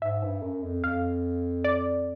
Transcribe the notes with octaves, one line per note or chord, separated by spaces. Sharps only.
G#2 E5
G2
F#2
F2
F2 F5
D5